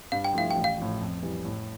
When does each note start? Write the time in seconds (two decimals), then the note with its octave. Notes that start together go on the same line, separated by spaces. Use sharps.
0.12 G2 F5
0.24 G5
0.33 F3 A3 E4 F5
0.51 G5
0.56 A1
0.64 F5
0.78 A2 F3
1.01 F2
1.23 E3 G3
1.45 A2